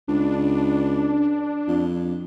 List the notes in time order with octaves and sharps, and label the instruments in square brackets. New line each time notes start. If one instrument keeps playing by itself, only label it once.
[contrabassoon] C#2 [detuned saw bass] D4
[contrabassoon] F2